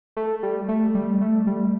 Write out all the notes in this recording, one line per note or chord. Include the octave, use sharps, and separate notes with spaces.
A3
G3
A3
G3
A3
G3